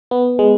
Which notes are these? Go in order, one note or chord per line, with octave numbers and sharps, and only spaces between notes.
B3
G#3